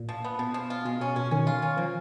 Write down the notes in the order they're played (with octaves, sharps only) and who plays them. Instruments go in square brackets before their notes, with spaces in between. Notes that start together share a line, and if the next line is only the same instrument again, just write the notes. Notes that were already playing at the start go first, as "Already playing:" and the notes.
Already playing: [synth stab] A#2
[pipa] F3
B3
[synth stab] B2 [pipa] F3
[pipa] F3
F4
[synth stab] B2 [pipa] G#3
[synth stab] B2 [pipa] C#4
[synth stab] B2 [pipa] C#4
[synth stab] D#3 [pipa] C#4
[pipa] F4
C#4
[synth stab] F3 [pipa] A#3